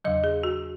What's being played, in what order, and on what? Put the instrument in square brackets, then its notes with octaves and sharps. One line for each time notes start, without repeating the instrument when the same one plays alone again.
[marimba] E2 C#3 F#3 D#5
G#4
F#4